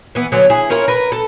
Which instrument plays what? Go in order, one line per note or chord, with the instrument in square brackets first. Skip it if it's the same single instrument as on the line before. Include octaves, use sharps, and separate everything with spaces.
[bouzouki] E3 B3
D3 F#3 B3 C#4
E4 G#4
C#4 E4 F4 A#4
A#4 B4
A4